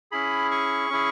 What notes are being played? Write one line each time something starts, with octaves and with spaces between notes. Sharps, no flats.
C#4 E4 G#4 B5
C#6
C#4 E4 G#4